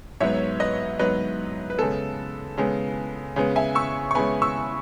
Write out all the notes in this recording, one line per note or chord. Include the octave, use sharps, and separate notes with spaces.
G#2 F#3 B3 C#5 E5
B4 D#5
G#2 F#3 B3 B4 D#5
B4
C#3 G#3 B3 A4
C#3 G#3 B3
C#3 G#3 B3
E5 G#5
C#6 E6
C#6
C#3 G#3 B3 G#5 B5
C#6 E6